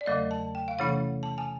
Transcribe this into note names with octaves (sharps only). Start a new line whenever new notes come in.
D5
E2 C#3 F#3 A3 D#5
A5
G5
F5
C3 E3 A3 C#4 E4 F#5
A5
G#5